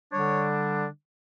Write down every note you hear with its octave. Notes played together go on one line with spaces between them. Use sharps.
D3 G3 D4 C#5